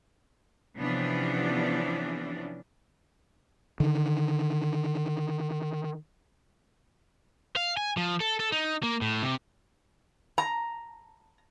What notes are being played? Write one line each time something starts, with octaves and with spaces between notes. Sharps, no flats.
C3 E3 F3 B3 C#4 D4
D3 D#3
F5
G#5
F3
A4
A4
D#4
A#3
A2
C3
A#5